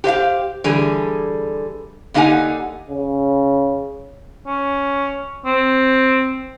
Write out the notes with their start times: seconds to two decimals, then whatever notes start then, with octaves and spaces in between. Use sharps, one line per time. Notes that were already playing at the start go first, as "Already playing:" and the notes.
0.04 G4 C5 E5 F5
0.64 D3 E3 G3 G#4
2.14 D3 A#3 D#4 G4 F#5 G#5
2.91 C#3
4.47 C#4
5.46 C4